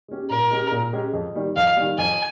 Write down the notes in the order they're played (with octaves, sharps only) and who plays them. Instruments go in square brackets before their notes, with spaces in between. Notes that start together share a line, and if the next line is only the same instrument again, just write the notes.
[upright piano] G#3 C#4 G4
[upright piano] A#2 [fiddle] A#4
[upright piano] G#3 C#4 G4
A#2
G#3 C#4 G4
F2
D#3 G3
[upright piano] F2 [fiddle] F5
[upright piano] D#3 G3
[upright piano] F2 [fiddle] G#5